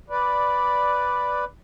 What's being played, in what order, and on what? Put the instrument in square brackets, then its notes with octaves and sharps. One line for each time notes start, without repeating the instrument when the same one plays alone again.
[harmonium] B4 D5